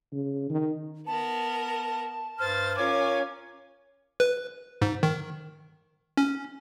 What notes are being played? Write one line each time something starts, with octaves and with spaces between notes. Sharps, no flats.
C#3
D#3
B3 A#4 A5
G2 C5 F6 A6
C#4 F4 A#4 C#5 G#5 D6
B4
G#2
D#3
C#4